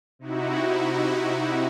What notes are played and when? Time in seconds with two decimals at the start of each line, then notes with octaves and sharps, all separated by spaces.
0.19 C3 D#4 E4 F#4